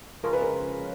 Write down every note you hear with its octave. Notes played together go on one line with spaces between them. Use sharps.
C#3 F3 G#3 C#4 F4 A#4
B4
A#4